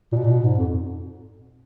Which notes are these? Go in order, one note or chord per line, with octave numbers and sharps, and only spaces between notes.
A#2
B2
A#2
B2
G#2
F2